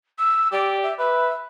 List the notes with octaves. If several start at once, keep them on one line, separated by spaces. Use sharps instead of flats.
E6
G4 D5
E5
B4 E5